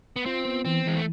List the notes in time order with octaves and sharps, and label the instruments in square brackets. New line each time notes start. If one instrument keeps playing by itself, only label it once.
[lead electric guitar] B3
[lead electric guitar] C4 [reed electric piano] F4
[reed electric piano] B3
[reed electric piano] E3 [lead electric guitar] C4
[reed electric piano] E3 [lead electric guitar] G#3
[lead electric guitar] A3